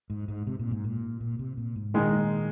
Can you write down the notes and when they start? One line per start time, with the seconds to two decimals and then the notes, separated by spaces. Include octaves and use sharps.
0.10 G#2
0.28 G#2
0.47 C3
0.59 A#2
0.71 G#2
0.84 A#2
1.20 A#2
1.39 C3
1.57 A#2
1.76 G#2
1.94 A#2 D#3 G#3 D#4